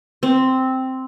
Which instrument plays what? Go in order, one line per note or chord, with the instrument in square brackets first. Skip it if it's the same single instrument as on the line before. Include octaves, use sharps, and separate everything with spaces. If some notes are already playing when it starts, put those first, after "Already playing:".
[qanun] C4